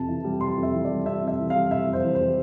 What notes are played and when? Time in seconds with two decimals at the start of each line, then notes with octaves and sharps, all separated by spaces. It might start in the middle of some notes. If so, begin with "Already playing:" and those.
Already playing: F2 C3 A5
0.08 E3
0.24 G3
0.41 C3 C6
0.57 F2
0.63 E5
0.73 E3
0.85 D5
0.90 G3
1.06 C3 E5
1.22 F2
1.28 E5
1.39 E3
1.50 G3 F5
1.71 C3 E5
1.88 F2 C5
2.04 E3
2.15 C5
2.20 G3